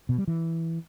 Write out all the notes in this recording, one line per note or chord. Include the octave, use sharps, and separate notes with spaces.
B2
G3
E3